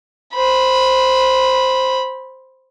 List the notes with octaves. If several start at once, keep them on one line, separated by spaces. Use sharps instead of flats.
C5 B5